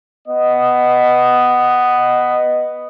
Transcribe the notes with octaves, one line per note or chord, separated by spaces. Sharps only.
B3 D#5